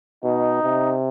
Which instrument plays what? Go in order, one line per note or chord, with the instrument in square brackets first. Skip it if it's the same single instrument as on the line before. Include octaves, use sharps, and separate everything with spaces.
[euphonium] B2 [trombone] D#4
[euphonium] C3